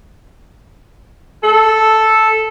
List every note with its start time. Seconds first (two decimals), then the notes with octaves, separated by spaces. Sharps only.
1.43 A4